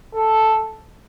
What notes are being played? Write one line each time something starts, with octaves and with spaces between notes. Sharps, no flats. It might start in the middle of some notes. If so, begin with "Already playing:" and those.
A4